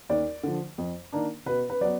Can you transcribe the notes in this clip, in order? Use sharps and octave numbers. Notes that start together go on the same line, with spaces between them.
D#2 D5
D3 F3
F2
D#3 A#3 D4
B2 B4
B4
F#3 B3 D5